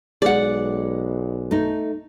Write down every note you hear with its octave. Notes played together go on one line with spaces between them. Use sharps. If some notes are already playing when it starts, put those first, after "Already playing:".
B1 G#3 D5 F#5
A3 D#4